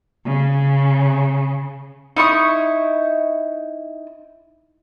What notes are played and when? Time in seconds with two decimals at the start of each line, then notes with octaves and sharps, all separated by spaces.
0.25 C#3
2.17 D#4 E4 C#6 D#6